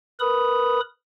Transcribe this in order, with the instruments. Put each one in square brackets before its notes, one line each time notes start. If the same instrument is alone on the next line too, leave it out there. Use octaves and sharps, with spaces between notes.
[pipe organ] A#4 B4 B5 D#6